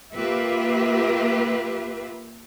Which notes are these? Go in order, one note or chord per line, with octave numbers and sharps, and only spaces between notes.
A#3 F4 G4 B4 E5